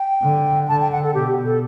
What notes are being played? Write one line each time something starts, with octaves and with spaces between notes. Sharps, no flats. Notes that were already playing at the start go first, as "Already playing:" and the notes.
Already playing: G5
D3
D3 A5
G5
F#5
A4
B2 G4
A4